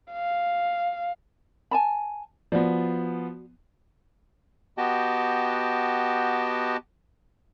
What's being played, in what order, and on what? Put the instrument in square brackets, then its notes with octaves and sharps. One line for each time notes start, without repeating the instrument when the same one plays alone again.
[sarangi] F5
[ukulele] G#5 A5 B5
[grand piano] F3 B3 [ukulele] F#4 D5
[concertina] B3 F#4 G4 D#5 G5 A5